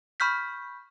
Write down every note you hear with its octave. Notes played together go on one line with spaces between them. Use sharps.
B5 C#6 F6 G6 B6